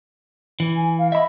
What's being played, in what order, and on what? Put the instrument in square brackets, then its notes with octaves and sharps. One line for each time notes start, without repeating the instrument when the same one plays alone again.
[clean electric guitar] E3
[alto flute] G#5
F5
[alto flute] D#5 [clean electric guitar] E5 B5